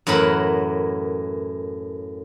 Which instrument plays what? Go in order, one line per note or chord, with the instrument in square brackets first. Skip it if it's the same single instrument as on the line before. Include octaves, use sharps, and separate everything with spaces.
[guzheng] F#2 A2 E3 A#4 F#5 B5